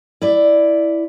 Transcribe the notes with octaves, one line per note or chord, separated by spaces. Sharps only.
E4 D5